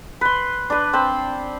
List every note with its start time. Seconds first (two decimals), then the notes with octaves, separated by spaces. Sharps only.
0.21 B4 C6
0.70 D4 B4
0.93 C4 C5 A5 B5